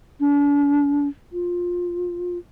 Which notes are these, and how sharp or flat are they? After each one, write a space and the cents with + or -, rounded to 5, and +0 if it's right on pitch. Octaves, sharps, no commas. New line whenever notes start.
D4 -40
F4 +15